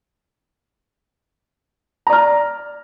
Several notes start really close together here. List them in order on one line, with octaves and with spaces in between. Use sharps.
A#5 D5 F6